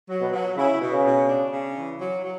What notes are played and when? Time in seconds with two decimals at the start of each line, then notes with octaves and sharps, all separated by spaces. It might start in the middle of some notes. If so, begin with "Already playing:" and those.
0.09 F#3
0.21 B2
0.33 F#3
0.56 C#3 E4
0.81 B2
0.92 C#3
1.04 B2
1.28 D4
1.51 C#3
1.76 E3
2.00 F#3
2.23 F#3